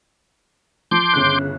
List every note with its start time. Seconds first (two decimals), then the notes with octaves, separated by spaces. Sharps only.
0.91 F3 C6 D6 G6
1.14 G1 C#3 F#6